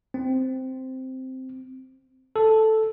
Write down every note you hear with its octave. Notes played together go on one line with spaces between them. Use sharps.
C4
A4